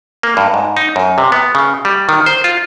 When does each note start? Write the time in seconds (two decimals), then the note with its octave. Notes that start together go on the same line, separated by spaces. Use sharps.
0.23 A#3
0.37 G2
0.54 G#2
0.77 D#4
0.96 F#2
1.18 C3
1.32 B3
1.55 C#3
1.85 G3
2.09 D#3
2.26 C5
2.44 F4